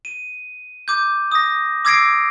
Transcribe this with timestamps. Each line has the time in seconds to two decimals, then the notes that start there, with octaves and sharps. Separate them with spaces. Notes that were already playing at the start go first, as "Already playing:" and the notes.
0.05 D#7
0.88 D6 G6
1.32 D#6 A#6
1.85 D6 E6 G#6 A#6 C7 D7